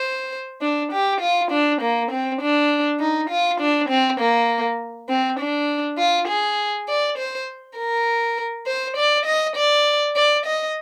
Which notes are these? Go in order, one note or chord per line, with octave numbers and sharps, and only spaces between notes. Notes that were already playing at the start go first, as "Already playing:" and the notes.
Already playing: C5
D4
G4
F4
D4
A#3
C4
D4
D#4
F4
D4
C4
A#3
C4
D4
F4
G#4
D5
C5
A#4
C5
D5
D#5
D5
D5
D#5